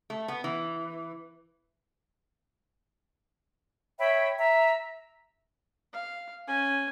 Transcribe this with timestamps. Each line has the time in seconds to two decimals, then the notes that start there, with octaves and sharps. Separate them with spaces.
0.10 A3
0.28 B3
0.44 E3
3.99 C#5 E5 G5 B5
4.39 E5 A#5
5.93 F5
6.47 C#4 G#5